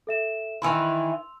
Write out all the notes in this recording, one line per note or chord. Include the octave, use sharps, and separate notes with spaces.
A4 E5 E7
D#3 E3 E4 C6 E6 F7